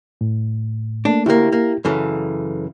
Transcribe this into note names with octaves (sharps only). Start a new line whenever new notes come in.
A2
A3 A#3 D4
D2 A#3 E4 G4
A#3
F#2 C#3 E3 A4